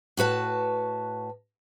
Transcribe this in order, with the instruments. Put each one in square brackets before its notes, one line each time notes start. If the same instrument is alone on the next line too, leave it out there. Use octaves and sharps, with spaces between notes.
[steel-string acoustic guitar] A2 F#4 B4 A5